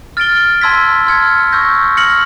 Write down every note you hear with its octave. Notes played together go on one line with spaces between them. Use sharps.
F6 A6 D7 G7
A5 C6 E6 G#6 B6
C6 F6 G#6 C#7
C#6 E6 G6 A#6
F6 A#6 C#7 F#7